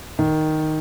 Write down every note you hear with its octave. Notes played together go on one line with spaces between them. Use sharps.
D#3